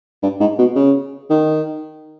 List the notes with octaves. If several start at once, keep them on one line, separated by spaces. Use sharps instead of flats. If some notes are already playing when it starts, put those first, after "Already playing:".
G2
G#2
B2
C#3
D#3